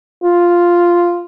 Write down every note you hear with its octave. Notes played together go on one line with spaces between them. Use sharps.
F4